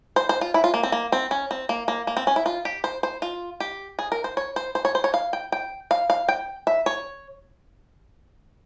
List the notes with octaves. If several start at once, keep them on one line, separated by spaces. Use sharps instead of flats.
C5
C5
F4
E4
F4
A#3
C4
A#3
C4
C#4
C4
A#3
A#3
A#3
C4
C#4
E4
F4
G4
C5
C5
F4
G4
G#4
A#4
C5
C#5
C5
C5
C#5
C5
C#5
F5
G5
G5
F5
F5
G5
E5
C#5